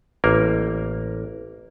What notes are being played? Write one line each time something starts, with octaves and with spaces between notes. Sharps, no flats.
A1 A#3 A#4